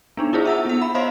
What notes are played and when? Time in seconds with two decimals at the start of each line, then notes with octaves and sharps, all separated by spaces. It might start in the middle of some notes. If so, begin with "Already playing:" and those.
0.17 B3 D4 D#4
0.33 E4 F4 G#4 C5
0.45 E5 F#5 E6
0.65 B3 F#5
0.82 B5
0.95 C5 C#5 D#5 F5 C6